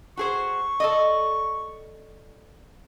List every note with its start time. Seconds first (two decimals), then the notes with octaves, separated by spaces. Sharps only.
0.17 F#4 G#4 C5 C#6
0.80 A4 D5 D#5